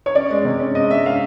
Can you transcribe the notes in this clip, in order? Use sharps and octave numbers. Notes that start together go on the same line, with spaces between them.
C#5
C#4 D5
G#3
C3
C#4
G#3 D#5
C#4 E5
C#4 F5